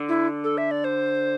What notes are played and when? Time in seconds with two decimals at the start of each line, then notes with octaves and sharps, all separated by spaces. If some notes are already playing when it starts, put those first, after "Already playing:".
Already playing: D3
0.09 E4
0.44 A4
0.58 E5
0.71 D5
0.84 C5